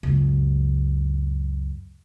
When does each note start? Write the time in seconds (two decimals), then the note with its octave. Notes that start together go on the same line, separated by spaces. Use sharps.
0.03 C#2 F#2